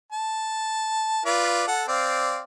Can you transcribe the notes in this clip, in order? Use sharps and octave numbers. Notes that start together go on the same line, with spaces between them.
A5
F4 B4 D5
A4 F#5
C4 D5 F5